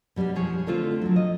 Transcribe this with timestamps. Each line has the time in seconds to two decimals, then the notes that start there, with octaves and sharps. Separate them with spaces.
0.16 B2 G3 A#3 C#4 D4
0.35 F3 G#4 C#5
0.67 D3 A3 C4 F4 C5
1.02 F3 F#3
1.16 D#5